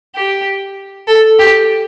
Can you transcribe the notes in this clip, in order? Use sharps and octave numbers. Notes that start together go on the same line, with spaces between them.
G4
A4
G4